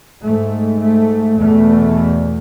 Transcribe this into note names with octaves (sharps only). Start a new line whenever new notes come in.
G#2 A3
A3
E2 B2 A3